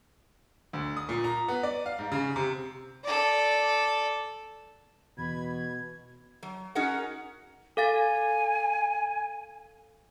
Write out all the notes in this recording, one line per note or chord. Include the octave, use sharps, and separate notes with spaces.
D2
D#6
A#2
A#5
B3
D5
F5
G#2
C#3
C3
A4 D5
E2 B2 B5 G#6
F#3
C#4 D#4 F#4 G#4 A#4 F#5
A4 F5 G#5 A6